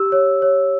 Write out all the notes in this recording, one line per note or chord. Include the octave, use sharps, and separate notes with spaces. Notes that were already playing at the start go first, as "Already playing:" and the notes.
Already playing: G4 E6
C#5
C#5